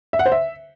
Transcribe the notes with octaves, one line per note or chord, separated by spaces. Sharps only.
E5
F#5
C5
E5